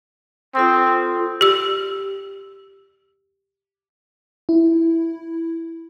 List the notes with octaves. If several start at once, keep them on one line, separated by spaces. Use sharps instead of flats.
C4 F4 A4 D#6
G4 E6
E4